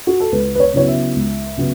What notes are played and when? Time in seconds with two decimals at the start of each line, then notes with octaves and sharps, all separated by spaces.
0.07 F#4
0.20 A4
0.32 C#2 B4
0.55 B4
0.60 C#5
0.74 C#3 F#3 B3 E4 C#5
0.88 E5
1.16 C#2
1.57 C#3 F#3 B3